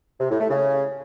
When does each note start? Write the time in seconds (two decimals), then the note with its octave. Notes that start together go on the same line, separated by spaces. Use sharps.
0.20 C3
0.30 A2
0.40 A3
0.50 C#3